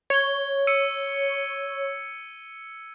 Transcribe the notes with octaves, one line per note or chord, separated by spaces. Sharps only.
C#5 G#6 G7
E6 C#7 D#7